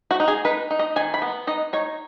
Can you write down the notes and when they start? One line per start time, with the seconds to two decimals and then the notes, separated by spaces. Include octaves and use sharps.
0.11 F#4
0.20 D#4
0.28 G#4
0.45 D#4 B4
0.71 D#4
0.79 D#5
0.96 D#3 G#5
1.14 B5
1.22 B3
1.47 D#4 D#5
1.73 D#4 C#5